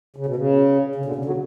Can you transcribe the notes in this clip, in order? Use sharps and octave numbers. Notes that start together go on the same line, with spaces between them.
C#3
B2
C#3
C#3
B2 D3
C#3
D3 F#3